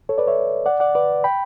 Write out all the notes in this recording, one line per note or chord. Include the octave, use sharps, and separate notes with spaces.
A4 C#5
B4 D5
C#5 E5
D5 F#5
D5 F#5
B4 D5
G5 B5